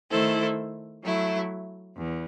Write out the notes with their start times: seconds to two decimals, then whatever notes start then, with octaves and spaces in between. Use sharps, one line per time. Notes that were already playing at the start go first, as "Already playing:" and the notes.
0.10 D#3 A3 E4 A4 C5
1.03 F#3 A3 E4
1.97 E2